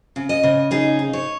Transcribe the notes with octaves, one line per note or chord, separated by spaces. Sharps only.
C#3
D#5
C#3
D#4 G#4
D#4
C#5